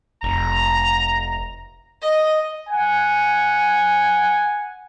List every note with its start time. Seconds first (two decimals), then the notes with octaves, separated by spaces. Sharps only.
0.23 F1 A#5
2.02 D#5
2.68 F#5 G#5